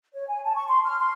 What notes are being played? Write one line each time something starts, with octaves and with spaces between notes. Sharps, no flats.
C#5
G#5
A5
C#6
C6
F6
C6